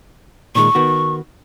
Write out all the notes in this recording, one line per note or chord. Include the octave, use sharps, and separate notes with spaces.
A#2 D#3 G#3 C#6
D#3 B3 F#4